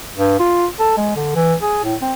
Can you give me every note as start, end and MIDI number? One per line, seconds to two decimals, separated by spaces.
0.17 0.39 43
0.40 0.66 65
0.79 0.97 69
0.97 1.13 56
1.16 1.34 50
1.35 1.55 52
1.62 1.80 68
1.84 1.95 45
2.02 2.14 60